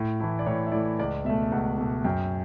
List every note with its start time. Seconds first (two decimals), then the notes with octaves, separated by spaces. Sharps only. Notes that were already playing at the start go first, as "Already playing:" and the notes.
Already playing: A2
0.20 E3 A3 E4
0.39 D5
0.46 A2 C#5
0.67 E5
0.72 E3 A3 E4 D5
0.99 C#2 D5
1.25 B2 E5
1.29 A3
1.43 E5
1.52 C#2 F#5
1.78 B2 A3
2.04 F#2 G5